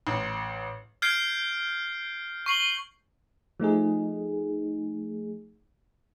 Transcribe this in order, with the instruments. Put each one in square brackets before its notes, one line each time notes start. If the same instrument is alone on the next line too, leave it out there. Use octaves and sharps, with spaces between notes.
[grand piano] A1
[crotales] F6 G6 G#6 C7 D7
C#6 C7 F#7 G7
[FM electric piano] F3 A3 D#4 G#4